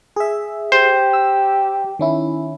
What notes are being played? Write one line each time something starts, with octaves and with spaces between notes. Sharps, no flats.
G#4 E5
G4 C5
E6
D#3 C#4 E4